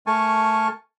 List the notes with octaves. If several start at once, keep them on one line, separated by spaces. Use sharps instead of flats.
A3 A#4 G#5 A5 C#6